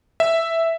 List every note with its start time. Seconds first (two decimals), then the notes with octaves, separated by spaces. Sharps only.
0.20 E5